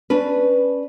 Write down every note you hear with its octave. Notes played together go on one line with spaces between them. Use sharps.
C#4 D4 B4